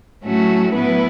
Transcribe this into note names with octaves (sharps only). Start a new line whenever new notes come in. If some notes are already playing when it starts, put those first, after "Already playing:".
A2 F#3 A3 C#4 F#4
A2 F#3 B3 E4 B4